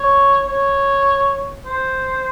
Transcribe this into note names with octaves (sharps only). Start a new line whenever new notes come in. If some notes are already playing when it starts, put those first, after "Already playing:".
Already playing: C#5
C#5
C5